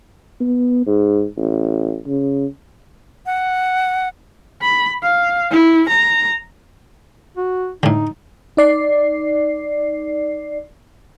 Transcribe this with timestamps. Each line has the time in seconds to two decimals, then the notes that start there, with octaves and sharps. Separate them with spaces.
0.41 B3
0.87 G#2
1.37 A1
2.07 C#3
3.26 F#5
4.62 B5
5.03 F5
5.51 E4
5.89 A#5
7.37 F#4
7.83 A2 D3 D#4
8.57 D#4 D5 C7